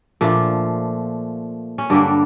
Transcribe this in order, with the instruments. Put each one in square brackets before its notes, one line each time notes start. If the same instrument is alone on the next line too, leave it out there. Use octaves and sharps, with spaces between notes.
[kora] A#2 F3 A3 D4
C#4
G2 D3 G3 A#3 D4